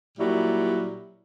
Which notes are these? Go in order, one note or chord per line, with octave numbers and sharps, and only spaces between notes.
A#2 F#3 G3 E4